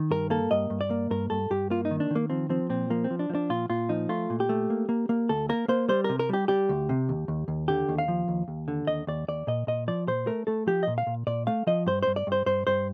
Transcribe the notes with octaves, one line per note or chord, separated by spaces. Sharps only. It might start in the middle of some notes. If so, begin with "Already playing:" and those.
Already playing: D#3
G2 A#4
A#3 A4
G2 D#5
G2
D5
A#3
G2 A#4
G2 A4
G2 G4
A#3 F4
D#4
D#3
D4
D#3 A#3
F3 C4
F3 C4
A#2 C4
F3 A#3
C4
F3
D4
F3
D4
A#2 F4
A#2 F4
F3 D#4
A3 F4
A#2
G4
A3
A#3
A#3
A#3
D2 A4
A#3 A#4
A#3 C5
G3 C5
C3 A#4
A#4
G3 G4
G3 G4
D2
C3
D#2
D#2
D#2
D3 G4
D#2
F5
F3
D#2
D#2
D3
D#2 D#5
D#2 D5
D#2 D5
A#2 D#5
A#2 D#5
F3 D5
A#2 C5
A3 A#4
A3 A4
F3 G4
A#2 D#5
F5
A#2
A#2 D5
A3 F5
F3 D#5
G2 C5
G2 C5
D5
G2 C5
G2 C5
G2 C5